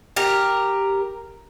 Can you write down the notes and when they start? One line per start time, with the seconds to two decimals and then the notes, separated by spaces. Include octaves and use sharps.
0.16 G4 A#4